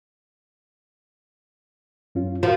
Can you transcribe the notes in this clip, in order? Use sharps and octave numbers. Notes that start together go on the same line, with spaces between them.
F#2 C#4 F4
F3 F#4 A#4